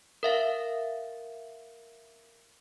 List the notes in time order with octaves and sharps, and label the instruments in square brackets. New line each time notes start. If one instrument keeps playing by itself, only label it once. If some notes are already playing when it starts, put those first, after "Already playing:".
[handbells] A#4 E5 F5